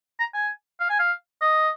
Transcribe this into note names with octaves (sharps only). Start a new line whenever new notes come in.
A#5
G#5
F5
G#5
F5
D#5